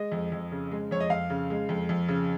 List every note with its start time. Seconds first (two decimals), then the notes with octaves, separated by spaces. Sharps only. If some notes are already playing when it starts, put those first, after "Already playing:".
Already playing: G#3 D#5
0.12 F2
0.32 F2
0.52 C#3
0.71 G#3
0.91 F2 C#5
1.00 D#5
1.10 F2 F5
1.30 C#3
1.50 G#3
1.69 F2
1.89 F2
2.08 C#3